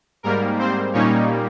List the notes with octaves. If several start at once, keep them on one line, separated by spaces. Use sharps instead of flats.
G#2 G3 A#3 A#4
C4 C5
A#2 G3 A#3 C#4 D#4 C#5